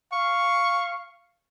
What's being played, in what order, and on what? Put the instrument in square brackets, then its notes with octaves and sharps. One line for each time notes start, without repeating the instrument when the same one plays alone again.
[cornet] F5 [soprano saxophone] C#6